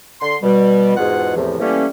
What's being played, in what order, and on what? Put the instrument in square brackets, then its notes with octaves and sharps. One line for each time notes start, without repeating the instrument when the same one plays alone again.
[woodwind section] D3 C6
B2 G3
E2 G#2 B2 F4 G#4 F#5
E2 A2 C3 F3
E3 G3 A3 A#3 C#4